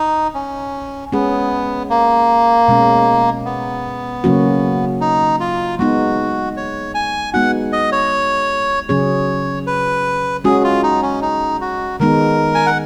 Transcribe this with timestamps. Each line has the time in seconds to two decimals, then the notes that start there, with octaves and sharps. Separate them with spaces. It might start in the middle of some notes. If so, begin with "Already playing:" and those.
Already playing: D#4
0.35 C#4
1.12 G#3 B3 C#4 G#4
1.90 A#3
2.68 B2 G#3 C#4
3.45 B3
4.24 C#3 F#3 A#3 C#4 F#4
5.01 D#4
5.40 F4
5.79 G#3 B3 D#4 F#4
6.57 C#5
6.95 G#5
7.34 G#3 B3 D#4 F#4 F#5
7.73 D#5
7.92 C#5
8.89 C#3 F#3 C#4 G#4 C#5
9.67 B4
10.44 G#3 C#4 F#4 G#4
10.64 F4
10.83 D#4
11.02 C#4
11.22 D#4
11.61 F#4
12.00 D#3 G#3 B3 D#4 A#4
12.55 G#5
12.66 F#5